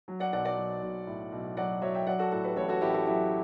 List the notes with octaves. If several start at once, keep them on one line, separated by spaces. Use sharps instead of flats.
F#3
D5 F#5
B1 D5 F#5
D5 F#5
F#3
B1
A2
B1
F#3 D5 F#5
F#3 C#5 E5
E5 G5
F#3 D5 F#5
F#4 A4
A2 F#4 A4
G4 B4
A1 A4 C#5
F#4 A4
A1 E4 G4
F#4 A4
F#3 E4 G4